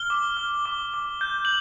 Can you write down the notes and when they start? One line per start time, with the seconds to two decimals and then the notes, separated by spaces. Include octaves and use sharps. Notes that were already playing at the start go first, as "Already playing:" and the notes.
Already playing: F6 G7
0.10 D6
0.37 F6
0.65 D6
0.94 D6
1.21 G6
1.45 F#7